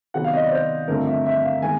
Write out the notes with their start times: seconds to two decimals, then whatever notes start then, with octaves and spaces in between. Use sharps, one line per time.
0.14 C3 D#3 F#3 B3 F#5
0.24 F5
0.33 D#5
0.42 D5
0.52 C5
0.88 G2 D3 F3 A3 C4 A#4
1.07 E5
1.26 E5
1.44 F5
1.62 D#3 G#3 B3 G#5